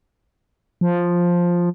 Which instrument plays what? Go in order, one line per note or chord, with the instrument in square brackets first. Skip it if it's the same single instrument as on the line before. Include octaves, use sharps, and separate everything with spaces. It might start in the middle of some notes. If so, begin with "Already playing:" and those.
[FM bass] F3